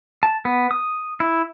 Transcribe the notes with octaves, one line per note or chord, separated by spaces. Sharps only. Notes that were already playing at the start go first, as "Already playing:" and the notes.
A5
B3
D#6
E4